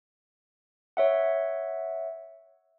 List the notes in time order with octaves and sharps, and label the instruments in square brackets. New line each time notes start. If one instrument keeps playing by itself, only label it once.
[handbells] C#5 E5 F#5